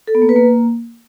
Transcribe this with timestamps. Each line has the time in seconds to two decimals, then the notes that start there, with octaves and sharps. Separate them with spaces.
0.08 A4
0.15 B3
0.22 A#3
0.29 B4
0.36 A#3